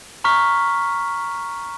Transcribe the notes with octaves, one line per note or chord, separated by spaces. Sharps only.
A#5 C#6 F6 B6